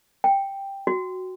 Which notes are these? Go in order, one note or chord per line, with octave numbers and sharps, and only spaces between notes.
G5
F#4